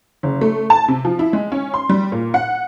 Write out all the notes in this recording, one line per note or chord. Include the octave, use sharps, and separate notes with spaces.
F#1
A3
A5
C3
F3
E4
G#3
C#4
C6
G3
A#2
F#5